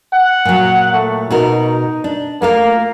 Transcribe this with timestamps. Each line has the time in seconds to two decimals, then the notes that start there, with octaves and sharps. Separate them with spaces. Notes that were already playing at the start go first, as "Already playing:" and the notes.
0.13 F#5
0.45 A#2 F#3
0.93 A3
1.30 B2 D#4 F#4 A#4
2.04 D4
2.42 A3 A#3 F4 A#4